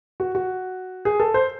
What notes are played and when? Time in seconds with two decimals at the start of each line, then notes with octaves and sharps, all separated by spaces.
0.20 F#4
0.35 F#4
1.05 G#4
1.20 A4
1.34 C5